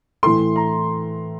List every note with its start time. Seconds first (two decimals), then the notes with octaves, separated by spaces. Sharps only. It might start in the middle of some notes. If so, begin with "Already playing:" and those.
0.23 A2 E3 A3 C6
0.56 A#5